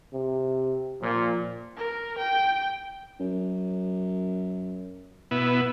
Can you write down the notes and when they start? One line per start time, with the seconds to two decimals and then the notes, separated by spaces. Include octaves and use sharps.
0.13 C3
1.01 A#2 F3
1.77 A#4
2.18 G5
3.20 F#2
5.31 B2 B3 E4